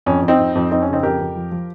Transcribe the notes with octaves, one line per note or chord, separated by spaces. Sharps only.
F2 C#4
F2
C4 D#4
F2
F2
F2 C4 D#4
C#4
C#3
C4 D#4
F2 G4 A#4
F2
F3
F3